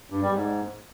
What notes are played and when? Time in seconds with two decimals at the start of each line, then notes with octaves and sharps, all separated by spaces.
0.10 G2
0.22 G3
0.34 G#2